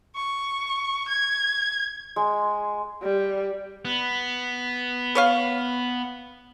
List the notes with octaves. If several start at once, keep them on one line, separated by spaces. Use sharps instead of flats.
C#6
G#6
G#3
G3
B3
B4 C#5 F5